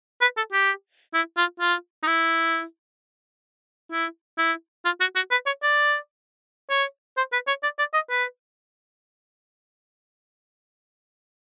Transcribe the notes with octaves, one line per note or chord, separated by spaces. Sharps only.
B4
A4
G4
E4
F4
F4
D#4
E4
E4
E4
F4
F#4
F#4
B4
C#5
D5
C#5
C5
B4
C#5
D5
D5
D#5
B4